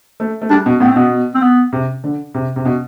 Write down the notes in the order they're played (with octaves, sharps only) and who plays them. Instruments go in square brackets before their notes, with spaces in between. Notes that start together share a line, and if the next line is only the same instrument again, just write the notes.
[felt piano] A3
A3
[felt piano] G3 [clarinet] D4
[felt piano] B2
[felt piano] A2 [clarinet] B3
[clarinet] C4
[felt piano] B2 [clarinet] B3
[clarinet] C4
B3
[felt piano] C3
D3
C3
C3
B2